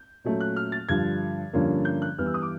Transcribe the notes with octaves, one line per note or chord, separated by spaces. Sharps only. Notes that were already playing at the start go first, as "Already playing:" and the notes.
Already playing: G6
A#2 F#3 A3 C#4
F#6
F6
A6
G2 D3 F3 G#6
G2 D3 F3 A#3 C#4
G6
F#6
G2 E3 G3 B3 F6
E6
D#6
D6